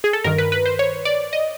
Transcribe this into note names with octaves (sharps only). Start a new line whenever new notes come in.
G#4
A4
G2 D#3 A#4
B4
B4
C5
C#5
D5
D#5